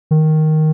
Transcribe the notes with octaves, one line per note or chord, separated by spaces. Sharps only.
D#3